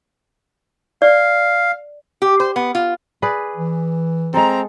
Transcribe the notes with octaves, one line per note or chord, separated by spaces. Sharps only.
D5 F5
G4
C5
B3
F4
G#4 B4 D5
E3
G#3 C4 A4 A#5